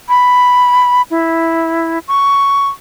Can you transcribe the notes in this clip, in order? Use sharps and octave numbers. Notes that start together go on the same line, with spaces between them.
B5
E4
C#6